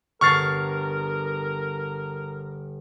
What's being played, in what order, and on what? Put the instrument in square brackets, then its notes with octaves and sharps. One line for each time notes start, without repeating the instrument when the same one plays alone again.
[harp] G1 C7 [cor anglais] A#4 [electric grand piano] C#6 F6 A6